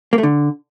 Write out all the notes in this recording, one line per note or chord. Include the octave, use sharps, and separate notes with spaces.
A#3
A3
D3